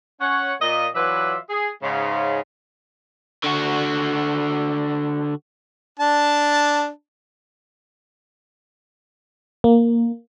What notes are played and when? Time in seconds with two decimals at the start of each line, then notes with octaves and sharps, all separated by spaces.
0.21 C#4 C#5 F#5
0.61 A#2 D#5
0.95 E3 F#3 F4 B4 D5 E5
1.49 G#4
1.83 G#2 C#3
3.44 D3 F#4
5.99 D4 A5
9.64 A#3